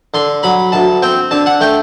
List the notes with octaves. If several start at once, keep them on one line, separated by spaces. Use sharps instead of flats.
D3 C6
F#3 B5
D2 A5
C4 G5
D3 A5
F#5
A3 G5